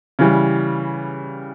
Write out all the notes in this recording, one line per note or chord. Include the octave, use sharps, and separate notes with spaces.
C#3 E3 G3